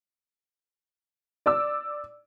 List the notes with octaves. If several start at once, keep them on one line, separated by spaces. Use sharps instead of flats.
D5 D6 E6